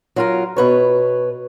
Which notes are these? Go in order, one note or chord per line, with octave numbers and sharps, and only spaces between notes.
F#3 F4 A#4
B2 B4 C#5